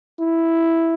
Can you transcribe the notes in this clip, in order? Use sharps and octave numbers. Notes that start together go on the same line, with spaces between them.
E4